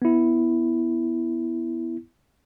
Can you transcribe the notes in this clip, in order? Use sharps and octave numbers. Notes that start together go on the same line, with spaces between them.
B3 E4